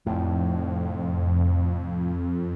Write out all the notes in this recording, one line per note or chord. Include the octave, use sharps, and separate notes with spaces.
F1 F2 A2